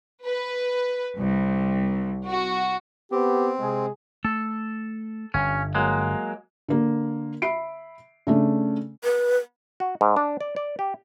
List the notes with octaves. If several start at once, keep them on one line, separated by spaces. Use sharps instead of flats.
B4
C2
F#4
B3 C4 G4
C3 G#3 G#4
A3 A4
G1 G2 C#4
F#3 G#3 A#3
D3 A#3
E5 B5 C7 D7
C#3 A3 D4
B4
F#4
G#2
D4
D5
D5
G4